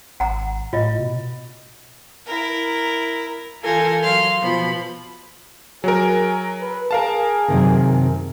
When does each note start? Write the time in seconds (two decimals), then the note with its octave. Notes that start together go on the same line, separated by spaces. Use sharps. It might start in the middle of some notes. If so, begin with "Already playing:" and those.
0.20 G#1 F#5 A#5
0.73 A2 F4 D#5
0.99 B2
2.26 E4 A#4
3.61 E3 F4 A4 A#4 G#5 G6
4.02 F#3 F5 C6
4.41 B2 F3 B5
5.84 F#3 G#4 A#4
6.61 B4
6.91 G#4 A#4 F5 A5
7.48 F#2 C3 D#3